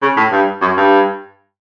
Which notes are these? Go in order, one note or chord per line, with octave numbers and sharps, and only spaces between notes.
C#3
A2
G2
F#2
G2